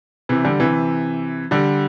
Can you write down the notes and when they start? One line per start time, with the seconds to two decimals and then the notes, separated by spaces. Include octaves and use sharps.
0.29 C3 E3
0.45 D3 G3
0.60 C3 E3
1.51 D3 G3